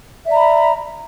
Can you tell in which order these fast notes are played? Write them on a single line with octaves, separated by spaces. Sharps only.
E5 D5 A#5 B5